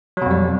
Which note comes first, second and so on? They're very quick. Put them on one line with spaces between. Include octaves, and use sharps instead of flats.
F#3 B2 F2 G3